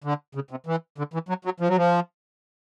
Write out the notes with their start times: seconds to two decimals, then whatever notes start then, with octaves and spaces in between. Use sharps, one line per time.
0.04 D3
0.35 C#3
0.51 C3
0.67 E3
0.98 D3
1.14 E3
1.29 F#3
1.45 F#3
1.60 F3
1.68 F#3
1.77 F3